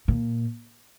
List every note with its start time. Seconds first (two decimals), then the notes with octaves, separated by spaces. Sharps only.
0.08 A#2